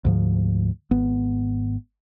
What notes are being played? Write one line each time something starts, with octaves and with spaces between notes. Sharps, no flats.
D2 G#2 F3
G#1 B3